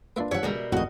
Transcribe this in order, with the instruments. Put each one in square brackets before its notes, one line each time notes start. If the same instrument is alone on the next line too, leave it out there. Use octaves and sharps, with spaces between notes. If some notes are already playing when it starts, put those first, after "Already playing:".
[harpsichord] A#3 E5 C6 [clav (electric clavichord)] D4 F4 B4
[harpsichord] G2 F3 [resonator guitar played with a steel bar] C#5 F#5 [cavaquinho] E5
[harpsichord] C#2 G#3 [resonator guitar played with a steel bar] B2 G3 A#4
[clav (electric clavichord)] G#1 F2 A2 [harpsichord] E4 [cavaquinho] F#4 D#5